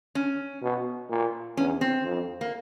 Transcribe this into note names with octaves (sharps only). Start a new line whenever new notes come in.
C#4
B2
A#2
E2 C#4
C4
F2
A#3